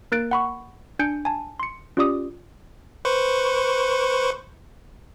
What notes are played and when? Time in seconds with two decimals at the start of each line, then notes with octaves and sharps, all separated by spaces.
0.12 A#3 A#4 F#6 A6 D7
0.31 F#5 B5 C#6
0.99 D4 G#5 G6 C#7 D7
1.25 G#5 A5
1.60 C6 C#7
1.97 C#4 F4 G4 D5 D6 D#6
3.05 B4 C5 C#6